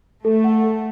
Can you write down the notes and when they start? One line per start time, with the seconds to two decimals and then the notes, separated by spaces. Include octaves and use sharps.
0.25 A3 A4
0.44 F#5
0.64 A4